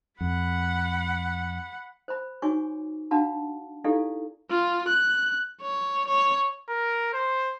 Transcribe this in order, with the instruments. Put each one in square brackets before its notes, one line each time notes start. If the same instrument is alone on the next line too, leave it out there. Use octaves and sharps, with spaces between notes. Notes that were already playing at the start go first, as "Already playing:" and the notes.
[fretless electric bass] F2 [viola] F#5 B5
[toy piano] C5 B5
D#4 F#4 C#5 G#5 C#6 D6
D4 F#4 F5 F#5 A5 B5
D#4 E4 G4 A4 D5 F5
[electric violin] F4
F#6
C#5
C#5
[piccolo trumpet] A#4
C5